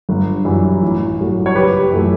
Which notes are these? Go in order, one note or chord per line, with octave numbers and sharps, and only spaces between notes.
G1
F#2 E3 G3
A1
G2 F#3 A3
C#5
F#1 G4 B4
F#2 E3 A3